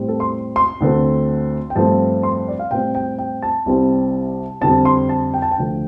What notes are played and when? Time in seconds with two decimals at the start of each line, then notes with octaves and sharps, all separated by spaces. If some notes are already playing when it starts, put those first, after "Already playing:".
Already playing: A2 G3 C4
0.08 A4
0.20 C6
0.56 C6
0.80 D2 D3 A3 C4
1.70 G5
1.75 G2 F3 A3 C4 A5
2.23 C6
2.48 D5
2.59 F5
2.71 A2 G3 C4 G5
2.95 G5
3.18 G5
3.42 A5
3.66 C2 C3 G3 C4
4.61 F2 D3 G3 C4 A5
4.85 C6
5.09 A5
5.34 G5
5.42 A5
5.51 G5
5.57 D2 D3 F3 A3